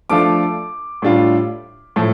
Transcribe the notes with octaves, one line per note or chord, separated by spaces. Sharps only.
F3 A3 D4 F4 D6
A2 G3 D4 F4
A2 F3 A3